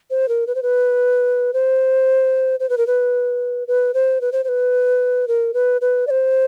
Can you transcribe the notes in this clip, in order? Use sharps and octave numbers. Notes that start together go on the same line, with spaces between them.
C5
A#4
B4
C5
B4
C5
C5
B4
A#4
B4
B4
C5
B4
C5
C5
B4
A#4
B4
B4
D5
C5